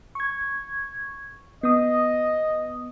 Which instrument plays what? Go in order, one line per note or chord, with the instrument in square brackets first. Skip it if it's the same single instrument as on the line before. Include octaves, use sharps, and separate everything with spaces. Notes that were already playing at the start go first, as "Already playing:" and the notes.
[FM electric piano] C#6 G#6
[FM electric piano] B3 D#6 [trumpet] D#5